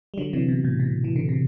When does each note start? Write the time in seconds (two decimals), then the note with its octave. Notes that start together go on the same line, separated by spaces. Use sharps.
0.14 G3
0.18 D3 F#3
0.33 C3 E3
0.48 B2
0.64 A2
0.80 B2
1.04 E3
1.16 D3
1.29 C3